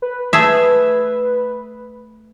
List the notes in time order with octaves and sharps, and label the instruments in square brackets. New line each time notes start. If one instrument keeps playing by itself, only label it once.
[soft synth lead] B4
[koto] A3 G#4 E5